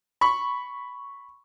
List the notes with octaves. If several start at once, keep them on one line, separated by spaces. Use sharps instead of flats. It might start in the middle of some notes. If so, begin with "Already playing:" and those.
B5 C#6